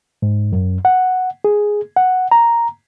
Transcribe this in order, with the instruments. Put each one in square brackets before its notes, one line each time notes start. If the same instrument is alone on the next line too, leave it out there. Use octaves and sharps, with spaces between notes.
[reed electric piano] G#2
F#2
F#5
G#4
F#5
A#5